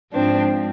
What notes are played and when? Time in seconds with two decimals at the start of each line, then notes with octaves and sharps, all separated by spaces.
0.13 G#2 F3 C4 D4